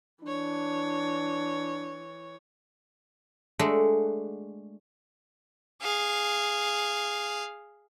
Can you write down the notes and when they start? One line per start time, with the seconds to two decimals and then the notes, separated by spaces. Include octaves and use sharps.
0.24 E3 D4 C#5
3.59 G#3 A3 D4 F#4
5.82 G#4 F5